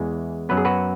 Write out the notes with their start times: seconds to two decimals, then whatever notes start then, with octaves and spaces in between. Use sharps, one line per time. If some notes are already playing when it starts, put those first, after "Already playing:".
Already playing: E2 E3 G#3
0.49 F#2 F#3 B3 B4
0.57 G#4
0.65 F#4 B4